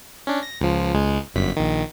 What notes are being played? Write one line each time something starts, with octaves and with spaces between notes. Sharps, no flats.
C#4 D4
A#6
C#2 F3
C#2 G#3
G1 F#2 B6
A#1 D#3